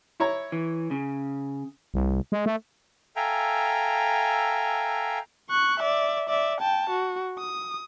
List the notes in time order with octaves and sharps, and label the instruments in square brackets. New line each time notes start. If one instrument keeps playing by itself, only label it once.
[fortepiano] E4 C#5 A#5
[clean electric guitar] E3
C#3
[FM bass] C2
G#3
A3
[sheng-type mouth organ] A4 E5 F5 G5 G#5 A#5
[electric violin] C#6 F#6
D5 E5
D5 E5
G5 A5
F#4
D#6